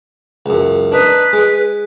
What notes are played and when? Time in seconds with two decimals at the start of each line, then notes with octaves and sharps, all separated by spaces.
0.46 C#2 F#2
0.92 D4 D#4 B4
1.33 G#3